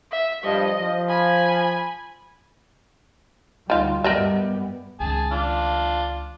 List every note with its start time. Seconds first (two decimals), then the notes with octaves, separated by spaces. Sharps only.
0.12 E5
0.44 G2 F3 G3 D#5
0.79 F3
1.09 G#5 B5
3.70 D2 D#3 G3 F4
4.04 G2 G3 B3 A#4 D#5 E5
5.00 C#2 D#3 G#4 A5
5.32 D4 F4